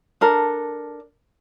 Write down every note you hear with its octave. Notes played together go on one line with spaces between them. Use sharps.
D4 A4 A#4